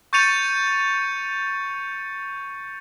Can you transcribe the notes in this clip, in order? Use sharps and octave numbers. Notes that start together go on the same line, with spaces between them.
C#6 G6 A6 C#7 D#7 F7